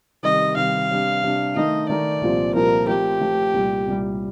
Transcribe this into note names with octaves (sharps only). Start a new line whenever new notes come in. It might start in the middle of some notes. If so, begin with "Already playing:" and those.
C3 D#3 G3 D#5
C3 D#3 G3 F5
C3 G3 D4
C3 G3 D4
D#3 A3 D#4 A#4 D#5
D#3 A3 D#4 A#4 D5
C2 A#2 F3 C4
C2 A#2 F3 C4 A#4
F3 A3 C4 G4
F3 A3 C4
C2 A#2 G3
C2 A#2 G3